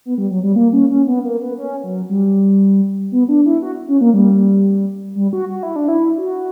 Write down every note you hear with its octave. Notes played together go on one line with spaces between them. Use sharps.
B3
G3
F#3
G3
A#3
C#4
C#4
B3
A#3
B3
C#4
F#3
G3
B3
D4
E4
F#4
C#4
A#3
G3
G3
F#4
F#4
E4
D4
E4
F#4